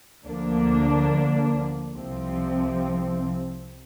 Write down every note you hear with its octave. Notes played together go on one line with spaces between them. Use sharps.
D2 D3 F3 A#3 D4
C2 C3 F3 C4